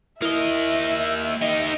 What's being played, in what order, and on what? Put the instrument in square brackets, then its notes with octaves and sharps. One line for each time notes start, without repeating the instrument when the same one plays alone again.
[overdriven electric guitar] A#3 D#5 [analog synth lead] E4 [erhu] E5
[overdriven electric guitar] D#4 G4 [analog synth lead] D#5